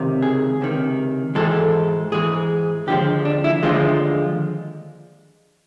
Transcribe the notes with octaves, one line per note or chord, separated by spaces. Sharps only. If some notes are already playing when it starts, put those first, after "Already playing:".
Already playing: C#2 C3 D#3
G#4
C#2 C3 D#3
G#2 E3 G#3 A4
G#2 E3 G#3 G#4
D#2 D3 F3 G#3 G4
D4
E4
D#2 D3 F3 G#3 F4